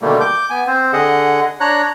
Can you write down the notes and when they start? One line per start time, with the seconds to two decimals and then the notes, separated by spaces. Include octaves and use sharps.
0.01 B2 D3 D#3 G3 A3 A#3
0.21 D6 G6
0.50 B3 G#5
0.67 C4 C5
0.93 D3 G#4 D#5 F#5
1.61 D4 C#5 A#5 F#6